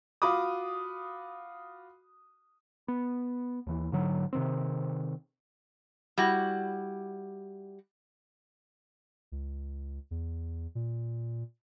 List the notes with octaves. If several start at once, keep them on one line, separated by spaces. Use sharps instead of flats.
F4 F#4 B5 D6 D#6
B3
D#2 E3
G#2 D3 F#3
C3 D#3 C4
G3 E4 F#4
C#2
E2
A#2